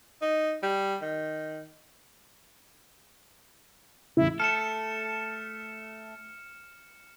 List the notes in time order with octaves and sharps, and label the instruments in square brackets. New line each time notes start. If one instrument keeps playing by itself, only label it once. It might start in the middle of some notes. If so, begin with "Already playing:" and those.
[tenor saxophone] D#4
G3
D#3
[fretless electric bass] E2 A2 C#3 [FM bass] E4
[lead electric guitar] A3 A4 [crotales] F6 C#7 E7